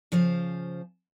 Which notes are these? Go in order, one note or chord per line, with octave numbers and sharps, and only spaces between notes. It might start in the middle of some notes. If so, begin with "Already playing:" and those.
C#3 F3 C5 F5